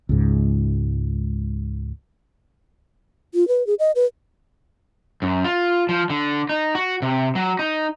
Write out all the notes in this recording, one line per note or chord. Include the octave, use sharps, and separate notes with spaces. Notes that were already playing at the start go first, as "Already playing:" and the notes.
C#2 G#2
F4
B4
G#4
D#5
B4
F#2
F4
F3
D3
D#4
F#4
C3
F#3
D#4